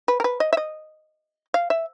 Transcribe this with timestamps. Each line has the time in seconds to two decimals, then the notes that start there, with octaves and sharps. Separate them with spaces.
0.08 B4
0.20 A#4
0.24 B4
0.40 D#5
0.53 E5
0.57 D#5
1.54 F5
1.70 E5